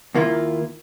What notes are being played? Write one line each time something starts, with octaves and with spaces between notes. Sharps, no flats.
D#2 A#3 E4 F4